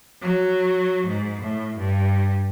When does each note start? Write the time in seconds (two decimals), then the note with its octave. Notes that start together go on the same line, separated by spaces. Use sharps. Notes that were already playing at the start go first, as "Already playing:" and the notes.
0.22 F#3
1.07 G#2
1.42 A2
1.78 G2